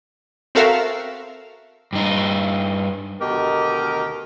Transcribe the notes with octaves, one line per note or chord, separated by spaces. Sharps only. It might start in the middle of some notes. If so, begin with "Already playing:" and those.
C4 F#4 A4 A#4 E5 F5
G2 D#4
D2 B2 D#3 G4 A#4 D#5